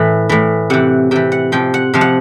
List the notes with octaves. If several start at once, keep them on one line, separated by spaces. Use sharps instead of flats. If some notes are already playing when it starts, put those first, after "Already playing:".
Already playing: A2 E3
A2 E3
C3 E3 F#5
C3 E3 G5
F#5
C3 F3 G5
F#5
C3 F3 F5
F#5